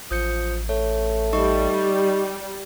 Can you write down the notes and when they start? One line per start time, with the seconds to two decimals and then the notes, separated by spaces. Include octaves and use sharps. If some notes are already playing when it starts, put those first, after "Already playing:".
0.11 A1 F3 D#6 G6 C#7
0.69 A3 C#5
1.33 G3 D#4 D#5 C#6